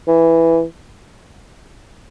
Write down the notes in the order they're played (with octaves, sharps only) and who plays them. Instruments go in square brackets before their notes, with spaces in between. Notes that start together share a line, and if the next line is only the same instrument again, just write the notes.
[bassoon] E3